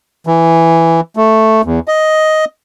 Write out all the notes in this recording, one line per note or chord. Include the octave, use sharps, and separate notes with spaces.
E3
A3
E2
D#5